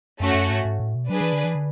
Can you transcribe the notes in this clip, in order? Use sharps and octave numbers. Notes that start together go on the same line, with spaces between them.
F#2 A3 C#4 F#4
F#2
G#2
G#2
A2
B2
F#3 D4 G#4 B4
E3
D3
E3
D3